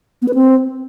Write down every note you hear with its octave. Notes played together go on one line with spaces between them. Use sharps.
B3
B4
C4